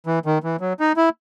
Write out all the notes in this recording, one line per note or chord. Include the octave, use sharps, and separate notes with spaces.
E3
D#3
E3
F#3
D#4
E4